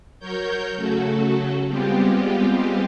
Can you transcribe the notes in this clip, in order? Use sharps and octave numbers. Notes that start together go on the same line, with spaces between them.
F#3 A#4 C#5 G6
C#3 F#3 A3 F#4 A4
G3 G#3 B3 C4 F4 G4